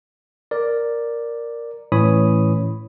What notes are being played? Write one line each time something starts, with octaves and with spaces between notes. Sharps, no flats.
A#4 D5
A2 E3 C#4 C#5 B5 D#6